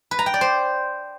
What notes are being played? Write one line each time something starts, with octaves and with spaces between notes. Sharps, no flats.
B4
A#5
G5
D5
C5